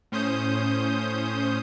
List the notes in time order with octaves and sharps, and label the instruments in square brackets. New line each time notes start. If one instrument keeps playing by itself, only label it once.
[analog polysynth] A2 C#4 C5 D#6 G6